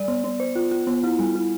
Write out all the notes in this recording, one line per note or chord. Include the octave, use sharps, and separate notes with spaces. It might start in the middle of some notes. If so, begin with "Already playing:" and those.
Already playing: G3 D5
B3
B3
C5
F4
F4
B3
E4
G3
E4